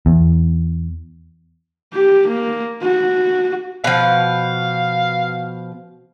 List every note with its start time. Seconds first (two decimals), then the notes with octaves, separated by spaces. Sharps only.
0.06 E2
1.93 G4
2.28 A#3
2.83 F#4
3.84 B2 F3 F5